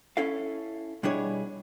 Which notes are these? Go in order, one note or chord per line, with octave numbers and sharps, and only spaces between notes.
C#4 E4 A4 F5
B2 G3 D4 E4 G#4 C#5